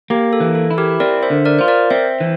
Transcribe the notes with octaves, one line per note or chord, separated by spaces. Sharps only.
A#3 G4
A4
E3
A4
E4
G4 A#4
C4 A#4 D5
C5 E5
D3
A#4 D5
F4 C5
A#4 D5
C4 C5 E5
E3